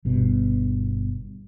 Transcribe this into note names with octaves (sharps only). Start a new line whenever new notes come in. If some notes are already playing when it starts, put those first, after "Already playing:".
G1 G2 B2